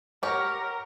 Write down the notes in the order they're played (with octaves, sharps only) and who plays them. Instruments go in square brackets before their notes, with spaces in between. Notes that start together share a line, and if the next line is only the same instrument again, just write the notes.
[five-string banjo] G4 C#5 [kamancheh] A#4 [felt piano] F#5 A#5 C#7